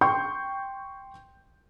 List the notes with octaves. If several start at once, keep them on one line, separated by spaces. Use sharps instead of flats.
G5 C6 C#6 G6